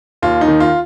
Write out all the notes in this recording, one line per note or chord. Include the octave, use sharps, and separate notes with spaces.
D#2 F4
D#4
D#3
F4